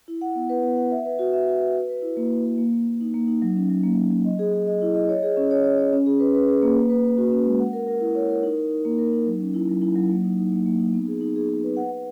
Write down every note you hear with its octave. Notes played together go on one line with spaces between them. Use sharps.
E4
F#5
B3
B4
B3
F#5
E5
B4
F#4
E5
F#4
B4
B4
B4
E4
A#3
E4
B4
A#3
A#3
A#3
D#4
A#3
D#4
F#3
C#4
F#3
A#3
A#3
F#3
D#5
G#4
G#4
D#5
E4
D#5
C#5
G#4
C#4
C#5
C#5
C#5
C#4
G#4
B4
B4
G#4
A#3
B4
B4
B4
F#4
C#4
G#3
F#5
A#4
A#4
E4
C#5
A#4
D#4
A#4
D#4
A#3
A#4
D#4
F#3
C#4
E4
F#3
E4
F#3
A#3
D#4
D#4
A#3
A#3
D#4
B3
G#4
D#4
G#4
G#4
B4
F#5
F#5